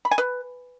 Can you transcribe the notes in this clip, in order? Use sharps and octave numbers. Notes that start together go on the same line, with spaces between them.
B5
G#5
B4